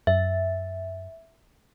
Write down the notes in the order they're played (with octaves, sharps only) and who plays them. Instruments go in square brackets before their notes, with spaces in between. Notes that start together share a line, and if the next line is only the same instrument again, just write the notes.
[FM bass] F#2 [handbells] E5